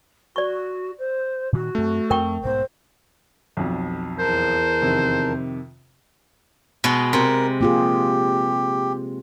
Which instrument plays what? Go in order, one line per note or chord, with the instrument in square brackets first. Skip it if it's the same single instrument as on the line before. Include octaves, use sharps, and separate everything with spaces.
[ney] F#4 [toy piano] D5 C#6
[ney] C5
[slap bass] A#2 D#3 [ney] F#4
[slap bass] F#2 C4 [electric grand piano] A3
[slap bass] F2 C4 [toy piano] A#4 G5 C#6
[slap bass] B1 G#2 B3 [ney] C5
[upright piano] B1 F2
[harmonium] E2 A#4 A5 [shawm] C5
[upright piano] F2 C3 D#3
[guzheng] B2 G#3
[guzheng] C3 [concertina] A#4
[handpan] A#3 F4 G#4 [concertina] G4